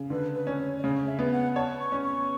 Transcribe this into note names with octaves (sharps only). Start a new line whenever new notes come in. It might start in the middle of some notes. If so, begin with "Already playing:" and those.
Already playing: C#3
D3 B4
B4
C#4
C#5
D5
C#3 C#5
E5
B3
F#5
C#5 A5
C#6
C#4
C#6